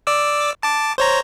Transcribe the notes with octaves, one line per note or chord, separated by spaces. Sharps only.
D5 D6 E6
A5 D6
C5 C#5 A#5